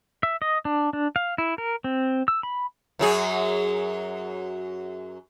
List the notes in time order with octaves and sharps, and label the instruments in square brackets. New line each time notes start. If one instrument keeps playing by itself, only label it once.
[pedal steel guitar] E5
D#5
D4
D4
F5
E4
A#4
C4
E6
B5
[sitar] F#2 F#3 G#4